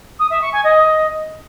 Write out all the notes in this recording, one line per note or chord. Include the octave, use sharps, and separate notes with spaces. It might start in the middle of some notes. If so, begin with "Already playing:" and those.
D#6
E5
C#6
G#5
D#5